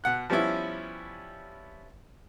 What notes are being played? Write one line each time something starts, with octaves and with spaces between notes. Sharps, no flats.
B2 F#5 F#6
F3 G3 B3 C#4 E4